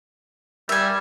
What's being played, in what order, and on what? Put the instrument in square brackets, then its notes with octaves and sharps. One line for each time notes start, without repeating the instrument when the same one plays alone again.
[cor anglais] G3 [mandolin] E5 G#5